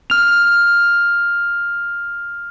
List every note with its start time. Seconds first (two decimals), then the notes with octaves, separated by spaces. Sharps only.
0.10 F6 F7